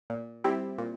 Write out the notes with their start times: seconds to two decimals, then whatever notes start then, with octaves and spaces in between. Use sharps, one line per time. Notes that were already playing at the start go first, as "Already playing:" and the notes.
0.10 A#2
0.44 G3 C4 E4 G4
0.78 A#2